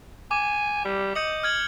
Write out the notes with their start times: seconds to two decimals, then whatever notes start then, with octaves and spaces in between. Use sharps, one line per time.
0.31 G#5 D6
0.85 G3
1.15 D#5 G6 C#7 F#7
1.43 F6 G#6 F#7